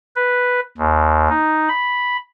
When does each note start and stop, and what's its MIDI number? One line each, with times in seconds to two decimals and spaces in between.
0.16 0.60 71
0.78 1.28 39
1.29 1.69 63
1.69 2.17 83